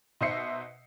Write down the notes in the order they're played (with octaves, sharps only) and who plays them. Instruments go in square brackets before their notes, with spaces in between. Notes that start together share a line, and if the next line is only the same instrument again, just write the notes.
[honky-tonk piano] B2 D#4 C5 E5 C7 C#7